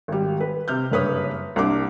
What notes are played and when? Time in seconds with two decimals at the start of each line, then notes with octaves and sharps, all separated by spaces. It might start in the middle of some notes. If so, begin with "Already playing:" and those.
0.08 G#1 G3
0.40 B4
0.68 C3 F6 G6
0.91 F#1 G2 B4 C#5 D#6
1.56 C2 A#3 D4 D6